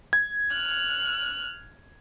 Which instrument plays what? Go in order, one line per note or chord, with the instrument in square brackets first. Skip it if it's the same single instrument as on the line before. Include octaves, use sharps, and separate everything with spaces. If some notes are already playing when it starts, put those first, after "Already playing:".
[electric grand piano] G#6
[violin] F6 F#6